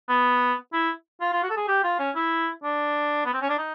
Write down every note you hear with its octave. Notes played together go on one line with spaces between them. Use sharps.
B3
E4
F4
F4
F#4
A4
G#4
G4
F4
C#4
E4
D4
B3
C4
C#4
D4
D#4